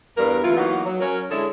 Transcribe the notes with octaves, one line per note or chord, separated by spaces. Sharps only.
E2 G2 A#4
D2 C3 E3 E4 F4
E3 F#3 A#3 B3 D#4 F#4
F#3
F#3 C#4 A#4
D3 G#3 E4 G#4 A4 C#5